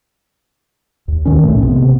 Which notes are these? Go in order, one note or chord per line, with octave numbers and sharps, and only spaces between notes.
D#2
D#2 D#3 C#4
B1 E2 A2 A3
C3 B3